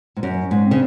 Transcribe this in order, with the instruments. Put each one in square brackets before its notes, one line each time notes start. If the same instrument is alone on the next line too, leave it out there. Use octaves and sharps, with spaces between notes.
[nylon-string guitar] G#2
[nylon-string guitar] F#2 [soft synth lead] C#4
[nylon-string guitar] G#2
[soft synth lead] C4
[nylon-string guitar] C#3